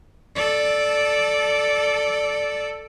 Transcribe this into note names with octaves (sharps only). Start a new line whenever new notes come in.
A4 D5